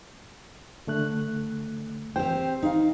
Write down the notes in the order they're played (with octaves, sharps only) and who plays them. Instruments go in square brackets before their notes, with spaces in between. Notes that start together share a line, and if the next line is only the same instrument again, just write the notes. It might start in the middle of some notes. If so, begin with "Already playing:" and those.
[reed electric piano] D3 A3 F#6
[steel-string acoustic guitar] C4 G4 C5 [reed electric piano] G5
[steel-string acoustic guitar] D#4 F5